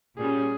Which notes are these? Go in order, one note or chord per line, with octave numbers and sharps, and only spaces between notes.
A#2 G3 C#4 G#4